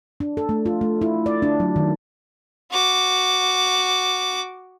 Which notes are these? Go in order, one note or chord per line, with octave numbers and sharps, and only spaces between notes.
D4
A4
A3
F4
A3
E4
D5
D4
F#3
D#3
F#4 D6